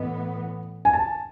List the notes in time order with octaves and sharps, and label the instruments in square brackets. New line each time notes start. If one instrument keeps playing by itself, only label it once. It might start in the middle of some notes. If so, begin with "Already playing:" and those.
Already playing: [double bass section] A2 E3 B3 [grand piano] D#5
[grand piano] G#5
A5